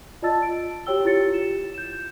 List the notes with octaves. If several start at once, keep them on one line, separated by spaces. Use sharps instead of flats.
F4 D5 D#5 A5 E6 A6
D7
F#4 G4 C#5 G5 E6 G7
E4 F4 G4 C#5 A6 C#7
E7
G6 E7